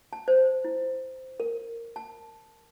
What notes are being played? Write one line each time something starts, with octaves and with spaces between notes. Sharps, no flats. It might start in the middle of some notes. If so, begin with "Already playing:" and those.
A5
C5
E4
A#4
A5